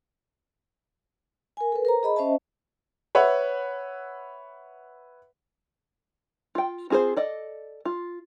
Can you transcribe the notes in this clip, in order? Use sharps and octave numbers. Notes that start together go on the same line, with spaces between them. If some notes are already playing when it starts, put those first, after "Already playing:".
A#4 G#5
A4 B4
A#4 C5 A#5
G#4 D#5 B5
C#4 C5 D#5 E5 A5
B4 C#5 E5 F#5
F4 G5
C4 F4 G#4 A#4 C5
A4 D5 D#5
F4